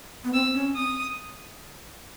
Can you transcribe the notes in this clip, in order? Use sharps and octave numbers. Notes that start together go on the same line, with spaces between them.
B3
C4 E6
C#4
C4 D#6